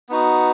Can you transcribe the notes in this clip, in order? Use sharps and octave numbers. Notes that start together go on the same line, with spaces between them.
B3 D#4 F#4